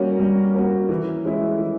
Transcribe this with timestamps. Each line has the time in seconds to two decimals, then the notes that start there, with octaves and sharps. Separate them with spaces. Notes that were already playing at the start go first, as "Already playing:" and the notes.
Already playing: G3 A#3 C#4 F#4
0.19 G3
0.55 A#3 C#4 F#4
0.89 E3
1.25 G#3 C#4 E4
1.59 E3